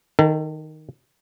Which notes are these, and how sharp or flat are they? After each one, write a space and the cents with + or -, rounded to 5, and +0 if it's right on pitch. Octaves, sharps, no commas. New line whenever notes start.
D#3 +0 A4 +35